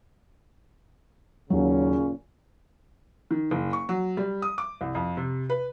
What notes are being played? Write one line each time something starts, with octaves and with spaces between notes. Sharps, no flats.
D#2 A#2 C#3 F#3 C#4
D#3
F#1
C#6
F#3
G3
D#6
D6
C2
F2
C3
B4